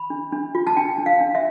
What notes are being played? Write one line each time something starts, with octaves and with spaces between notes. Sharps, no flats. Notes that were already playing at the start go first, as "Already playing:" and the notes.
Already playing: B5
D4
D4
F4
A5
D4 G5
D4
F5
D4
E5